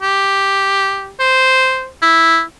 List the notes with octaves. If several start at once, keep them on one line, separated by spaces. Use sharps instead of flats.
G4
C5
E4